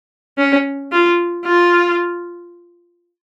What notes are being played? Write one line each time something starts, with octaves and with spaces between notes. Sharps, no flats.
C#4
F4
F4